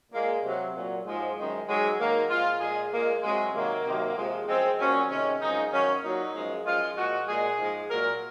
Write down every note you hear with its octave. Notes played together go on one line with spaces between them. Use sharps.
A#2 G#3 A#3
C3 F#3
A#2 F#3
G#2 F3 G#3
F#2 D#3 G#3
G#2 F#3 G#3
G#2 D#3 F#3 A#3
A#2 F3 G#3 F4
A#2 G#3 G#4
A#2 G#3 A#3
C3 F#3 G#3
C3 D#3 F#3 A#3
C3 D#3 F#3
C3 F3 G#3
F#2 F3 G#3 C4
A#2 F#3 C#4
C3 D#3 G#3 C#4
F#2 C#3 F3 G#3 D#4
F#2 D#3 F#3 C#4
A#2 F#3 D#4
F#2 F3 G#3
F#2 F3 G#3 F4
A#2 F3 G#3 F#4
A#2 G#3 G#4
G#2 F3 G#3
A#2 F#3 A#4